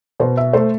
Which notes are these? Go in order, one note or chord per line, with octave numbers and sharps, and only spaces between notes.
B2 C5
E5
A3 C5